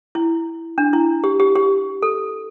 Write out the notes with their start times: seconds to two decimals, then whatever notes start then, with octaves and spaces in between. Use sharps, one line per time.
0.15 E4
0.78 D4
0.93 E4
1.24 G4
1.40 G4
1.55 G4
2.03 A4